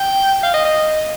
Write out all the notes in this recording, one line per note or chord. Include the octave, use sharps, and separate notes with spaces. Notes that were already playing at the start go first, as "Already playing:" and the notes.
Already playing: G5
F5
D#5
D#5